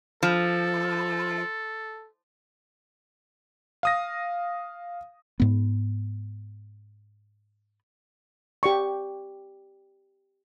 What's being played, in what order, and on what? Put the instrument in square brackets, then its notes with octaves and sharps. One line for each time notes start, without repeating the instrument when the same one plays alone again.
[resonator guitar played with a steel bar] F3 [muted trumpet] A4
[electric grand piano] F5 D#6 A#6
[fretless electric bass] G#2 B3
[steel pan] G4 D5 C#6